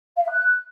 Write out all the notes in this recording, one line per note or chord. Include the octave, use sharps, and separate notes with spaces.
F5
E5
F#6